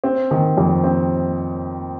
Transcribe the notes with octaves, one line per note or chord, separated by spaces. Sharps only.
C4
D#3
F2
C4